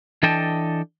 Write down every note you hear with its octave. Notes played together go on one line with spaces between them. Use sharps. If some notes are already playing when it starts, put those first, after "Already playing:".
E3 D4 A4 D#5 G5 A5